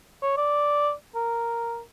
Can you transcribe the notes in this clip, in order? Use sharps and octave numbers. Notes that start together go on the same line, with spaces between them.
C#5
D5
A#4